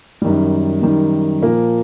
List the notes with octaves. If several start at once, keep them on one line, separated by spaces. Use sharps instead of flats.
F#2 D#3 G3
F#2 D#3 G3
A#2 F3 A#3